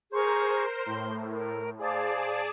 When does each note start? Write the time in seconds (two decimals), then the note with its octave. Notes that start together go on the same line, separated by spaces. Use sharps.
0.12 G#4 A#4 C5 A#5 C#6
0.86 A2 C6
1.31 A#4
1.79 G#4 C5 D5 F5 A5